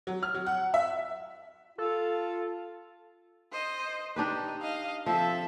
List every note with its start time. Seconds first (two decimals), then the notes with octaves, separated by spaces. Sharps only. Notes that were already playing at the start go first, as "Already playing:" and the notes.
0.07 F#3
0.23 F6
0.34 F#3
0.46 F#5
0.74 E5
1.78 F4 A4
3.52 C5 D#5
4.16 D4 D#4 G4 B4
4.63 D#5 F5
5.06 F3 C4 A4 E5